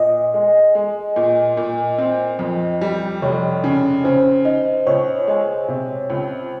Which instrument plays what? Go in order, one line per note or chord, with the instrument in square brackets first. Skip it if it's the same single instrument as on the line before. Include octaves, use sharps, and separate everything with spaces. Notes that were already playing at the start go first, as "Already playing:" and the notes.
Already playing: [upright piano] A#2 [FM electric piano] D#5
[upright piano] G#3
G#3
A#2
A#2
C4
F2
G3
[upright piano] F1 [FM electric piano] C#5
[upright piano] C#3
[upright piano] C#3 [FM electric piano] C5
[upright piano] D#4
[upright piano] C#2 [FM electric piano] C#5
[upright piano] G#3
C3
C#2